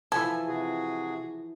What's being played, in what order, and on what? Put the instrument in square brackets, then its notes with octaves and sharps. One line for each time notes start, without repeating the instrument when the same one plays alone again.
[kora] E3 F3 B4 [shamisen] A4 [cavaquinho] G#5
[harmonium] C3 F#4 G#4